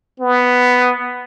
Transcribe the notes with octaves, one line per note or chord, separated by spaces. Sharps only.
B3